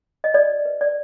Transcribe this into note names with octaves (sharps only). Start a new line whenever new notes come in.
D#5
F#4 D5
B4
D5